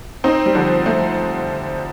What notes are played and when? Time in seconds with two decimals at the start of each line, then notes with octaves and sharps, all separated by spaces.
0.24 C4 D#4
0.46 G3
0.55 D3 F3
0.86 F3 A3